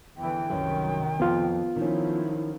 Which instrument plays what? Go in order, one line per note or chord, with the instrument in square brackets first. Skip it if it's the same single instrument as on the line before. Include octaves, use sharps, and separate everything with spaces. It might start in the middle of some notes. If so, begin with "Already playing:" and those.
[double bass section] E2 D3 E3 [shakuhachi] G5
[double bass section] C2 D#3 F#3 [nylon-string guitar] F#2
[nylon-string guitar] F2 [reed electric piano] B3 F4
[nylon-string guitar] D#3 C#4 [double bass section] F3 F#3 [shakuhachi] E4